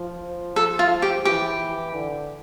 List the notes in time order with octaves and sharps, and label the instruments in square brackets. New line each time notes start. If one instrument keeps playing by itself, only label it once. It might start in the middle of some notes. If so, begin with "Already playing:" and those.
Already playing: [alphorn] F3
[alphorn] F3 [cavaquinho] A4
[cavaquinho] F4
G4
[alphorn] E3 [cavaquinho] G4
[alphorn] D3